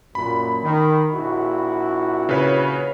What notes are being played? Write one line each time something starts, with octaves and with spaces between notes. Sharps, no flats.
F#2 A#2 B5
D#3
A#1 E4 F#4
C#3 B4 C#5